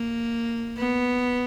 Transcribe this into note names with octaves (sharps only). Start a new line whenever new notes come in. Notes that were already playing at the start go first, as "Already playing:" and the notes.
Already playing: A#3
B3